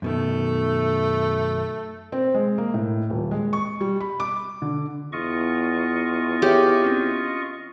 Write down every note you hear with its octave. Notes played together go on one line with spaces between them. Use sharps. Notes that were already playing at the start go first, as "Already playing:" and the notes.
F#2 B2 D#3 A3
C4
G#3
A#3
A2
D#1
G#3
C#6
G3
B5
D6
D3
E2 F4 D#5 C#6
G4 G#4 C#5 E5
C4 C#4